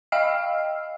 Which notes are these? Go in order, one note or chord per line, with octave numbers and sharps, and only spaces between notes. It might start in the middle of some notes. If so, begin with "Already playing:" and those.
D#5 F5 G5 E6 F6 C7